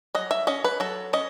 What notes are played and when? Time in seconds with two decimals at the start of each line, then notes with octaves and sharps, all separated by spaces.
0.15 F#3 D#5
0.31 E5
0.47 C#4 D#5
0.64 B4
0.80 F#3 A4
1.13 C#4 D#5